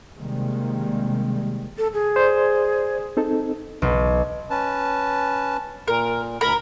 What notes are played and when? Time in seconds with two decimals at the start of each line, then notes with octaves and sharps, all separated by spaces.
0.17 C3 D#3 G3 G#3 A#3
1.77 A4
1.94 G#4
2.16 C5 D5
3.17 C4 D#4 A4
3.82 B1
4.50 C#4 B4 A5
5.88 A#2 A#4
6.41 D2 A#4 B5